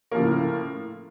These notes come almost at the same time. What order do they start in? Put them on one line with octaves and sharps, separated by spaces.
A#3 F3 C#3 A2